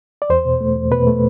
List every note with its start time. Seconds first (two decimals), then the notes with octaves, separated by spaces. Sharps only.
0.22 D5
0.30 E2 C5
0.45 B2
0.61 A3
0.76 E2
0.91 B2 B4
1.07 A3